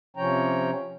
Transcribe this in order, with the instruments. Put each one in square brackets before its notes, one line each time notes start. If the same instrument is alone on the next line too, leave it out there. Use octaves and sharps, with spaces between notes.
[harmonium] C3 F3 C#4 C#5 G5 A#5